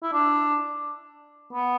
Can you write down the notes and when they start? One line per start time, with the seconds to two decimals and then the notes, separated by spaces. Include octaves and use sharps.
0.03 E4
0.13 D4
1.53 B3